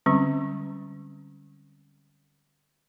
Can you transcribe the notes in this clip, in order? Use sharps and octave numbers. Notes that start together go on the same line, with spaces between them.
D3 G3 G#3 C4 C#4